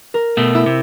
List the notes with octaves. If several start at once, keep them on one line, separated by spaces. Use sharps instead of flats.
A#4
B2 A3
E4 E6
C3